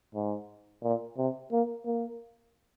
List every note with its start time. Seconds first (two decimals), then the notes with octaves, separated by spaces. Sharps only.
0.15 G#2
0.83 A#2
1.17 C3
1.52 A#3
1.86 A#3